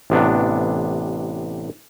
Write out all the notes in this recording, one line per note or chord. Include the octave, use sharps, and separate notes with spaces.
A1 C3 B3 D4